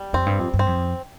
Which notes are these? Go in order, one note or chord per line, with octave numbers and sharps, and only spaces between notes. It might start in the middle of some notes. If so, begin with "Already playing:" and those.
Already playing: G3
F2 C4
G2
F2
G2
C4
F2